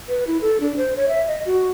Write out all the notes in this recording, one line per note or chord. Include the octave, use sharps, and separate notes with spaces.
B4
E4
A4
D4
C5
C#5
E5
D#5
F#4